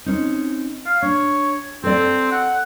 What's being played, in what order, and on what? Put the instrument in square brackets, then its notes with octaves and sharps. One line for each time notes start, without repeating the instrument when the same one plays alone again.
[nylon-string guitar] C4 C#4 D#4
[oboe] F5
[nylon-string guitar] D4 [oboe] C#5
[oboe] C4 [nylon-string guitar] A4 D5
[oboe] F#5